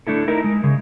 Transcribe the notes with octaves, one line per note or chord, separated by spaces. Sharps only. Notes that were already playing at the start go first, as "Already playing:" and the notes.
A3 D4 E4 A4
D#4 E4 A#4
G#3
C#3 G#3